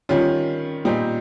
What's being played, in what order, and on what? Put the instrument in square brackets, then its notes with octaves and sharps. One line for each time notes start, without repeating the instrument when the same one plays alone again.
[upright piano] D#3 G3 C#4 F4
A#2 G3 C4 D#4